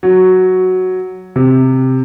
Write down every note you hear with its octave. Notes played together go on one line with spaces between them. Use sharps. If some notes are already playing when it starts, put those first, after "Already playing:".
F#3
C3